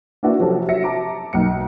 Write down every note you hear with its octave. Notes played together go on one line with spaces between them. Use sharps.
A#3 D4 E4 F#4 B4
C3 F3 F#3 C#4 G4 A4
F#3 E5 A#6 C#7
A5 A#5 D6 D7
B1 A#3 C#7